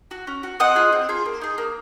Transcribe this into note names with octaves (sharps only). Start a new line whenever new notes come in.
F#4
C#4
F#4
C4 D#5 F#5
F4 G#4
C4
F4 G#4
A#3
D#4 G#4
A#3